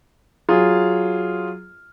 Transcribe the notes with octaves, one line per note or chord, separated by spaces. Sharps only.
F#3 F4 G#4